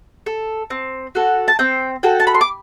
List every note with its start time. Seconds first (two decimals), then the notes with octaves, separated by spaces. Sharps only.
0.26 A4
0.70 C4
1.15 F#4 A4
1.48 A5
1.59 C4 G5
2.03 F#4 A4 G5
2.20 A5
2.27 B5
2.34 C6
2.41 D6